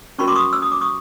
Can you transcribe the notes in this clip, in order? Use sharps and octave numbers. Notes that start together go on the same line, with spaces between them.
C#4 F#4 A#4 B5 C#6
C6 D6
C#6 D#6
E6
D#6
D6
C#6 D#6